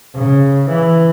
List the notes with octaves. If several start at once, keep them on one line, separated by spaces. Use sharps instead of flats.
C#3
E3